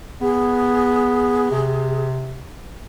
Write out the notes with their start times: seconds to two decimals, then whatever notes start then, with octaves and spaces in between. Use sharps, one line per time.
0.21 B3 G#4
1.51 C3